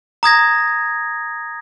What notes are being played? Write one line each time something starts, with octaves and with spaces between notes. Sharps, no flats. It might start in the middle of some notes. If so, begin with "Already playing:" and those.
A#5 D#6 G#6 A#6